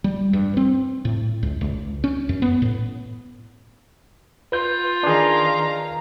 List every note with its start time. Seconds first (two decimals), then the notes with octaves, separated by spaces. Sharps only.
0.04 G3
0.33 G2
0.57 C4
1.05 A2
1.43 C#2
1.61 C#2
2.04 C#4
2.29 F#2
2.42 B3
2.62 A2
4.52 F4 B4 G6
5.03 D#3 D4 G#4 F5 A#5